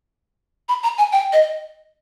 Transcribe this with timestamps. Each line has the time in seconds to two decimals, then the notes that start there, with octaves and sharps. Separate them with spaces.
0.69 B5
0.83 A#5
0.98 G#5
1.12 G5
1.33 D#5